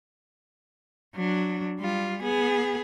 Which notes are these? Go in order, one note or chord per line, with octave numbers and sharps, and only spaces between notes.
F#3 D4
G3 F4
B3 G#4